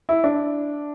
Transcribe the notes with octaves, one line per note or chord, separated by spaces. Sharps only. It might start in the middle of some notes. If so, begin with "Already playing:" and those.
E4
D4